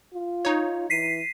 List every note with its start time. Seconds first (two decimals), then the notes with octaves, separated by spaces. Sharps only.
0.14 F4
0.45 D#4 C#5
0.90 E3 B6 C7 D#7